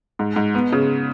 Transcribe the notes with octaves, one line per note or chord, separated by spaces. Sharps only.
G#2
G#2
B3
C#3